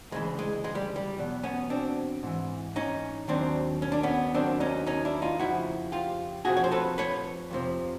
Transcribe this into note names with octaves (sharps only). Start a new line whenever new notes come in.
D2 C#3 E3 G#3
G#3
G#3
G3
G3
E2 B2 F#3
B3 C#4
C4 D4
G#2 E3
C#4 D#4
D#2 D#3 F#3 C4 D4
C#4
D4
B3 C#4
D#2 D#3 F#3 C4 D4
C#4 D#4
C#4 D#4
D4 E4
D#4 F4
F2 C#3 F3 E4 F#4
F4 G4
F2 C3 F3 F#4 G#4
C#5
C5
A4 B4
B4 C#5
F2 C3 F3